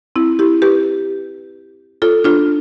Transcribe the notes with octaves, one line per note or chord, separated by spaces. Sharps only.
C4 E4
E4 G4
G4 B4
F4 A4
D4 F4